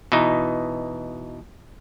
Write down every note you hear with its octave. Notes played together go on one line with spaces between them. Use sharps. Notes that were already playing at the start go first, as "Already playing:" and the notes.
B2 E3 D#4